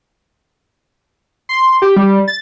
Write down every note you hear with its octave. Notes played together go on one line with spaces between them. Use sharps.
C6
G4
G3
A6